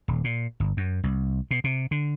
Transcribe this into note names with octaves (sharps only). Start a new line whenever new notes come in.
D#1
A#2
G1
F#2
C2
B2
C3
D3